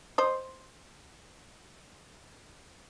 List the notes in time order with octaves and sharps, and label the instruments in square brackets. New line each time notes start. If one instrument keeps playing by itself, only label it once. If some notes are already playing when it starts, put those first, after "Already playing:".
[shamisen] C5 D#5